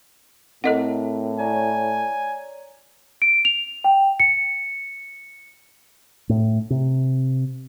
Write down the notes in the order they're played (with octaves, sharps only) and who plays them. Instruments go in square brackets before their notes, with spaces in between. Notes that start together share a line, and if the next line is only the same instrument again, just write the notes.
[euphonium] A2 [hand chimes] C4 E4 A#4 [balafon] A4 D#5 F#5
[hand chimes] C#5 D5 A#5 [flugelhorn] G#5
[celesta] D7
F7
G5
C#7
[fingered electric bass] A2
C3